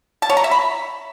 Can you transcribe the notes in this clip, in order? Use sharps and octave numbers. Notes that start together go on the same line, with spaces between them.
A5
C#5
A#5
E5
B5